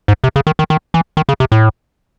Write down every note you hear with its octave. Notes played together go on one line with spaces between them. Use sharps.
G#2
C3
C#3
D#3
D#3
D#3
E3
D#3
C#3
C3
A2